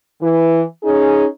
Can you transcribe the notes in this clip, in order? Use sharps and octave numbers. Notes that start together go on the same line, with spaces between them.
E3
C#4 D#4 G#4